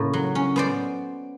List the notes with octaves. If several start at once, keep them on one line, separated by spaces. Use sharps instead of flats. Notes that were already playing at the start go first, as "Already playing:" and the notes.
Already playing: A2 C#3 A#3
F#3
C#4
B3 C5 D5